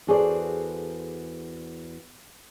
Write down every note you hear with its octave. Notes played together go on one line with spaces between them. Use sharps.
E2 F#4 G#4 A4 C5 D5